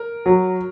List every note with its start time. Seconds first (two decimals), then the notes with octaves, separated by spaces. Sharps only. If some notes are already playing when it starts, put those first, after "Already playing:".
Already playing: A#4
0.26 F#3